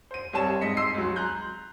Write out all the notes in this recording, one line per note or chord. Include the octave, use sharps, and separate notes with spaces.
C5 D#7
C2 G3 C4 C#5 A5 E7
G#2 D#5 B6 C#7
C6 E6 C7 D#7
C#2 F#3
A#5 C6 F#6 G6